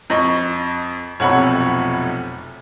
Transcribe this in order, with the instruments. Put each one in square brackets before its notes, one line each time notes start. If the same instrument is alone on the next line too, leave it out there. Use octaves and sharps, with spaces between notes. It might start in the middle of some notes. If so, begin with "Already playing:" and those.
[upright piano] F2 D#5 C#6
[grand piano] F1 B1 F2 [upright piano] C#5 F#5 B5